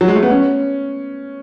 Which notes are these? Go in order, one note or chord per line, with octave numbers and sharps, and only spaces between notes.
F#3
G#3
A3
B3
C#4